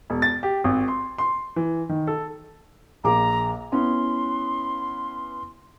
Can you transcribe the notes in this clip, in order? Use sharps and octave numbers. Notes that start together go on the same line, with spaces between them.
E1
A6
G4
G#1
C6
C6
E3
D#3
A4
A#1 G#4 A#5 D6
B3 C#4 E4 C6